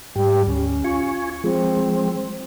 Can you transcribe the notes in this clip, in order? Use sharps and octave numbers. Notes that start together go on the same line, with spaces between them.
G#2 G3 G4
D2 C#4
F4 G#5 C#6
F3 G#3 C4